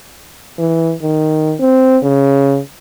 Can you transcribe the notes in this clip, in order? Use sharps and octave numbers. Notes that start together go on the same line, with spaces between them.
E3
D#3
C4
C#3